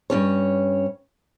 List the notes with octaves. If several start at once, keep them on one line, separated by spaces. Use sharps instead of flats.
G2 C3 C#4 C#5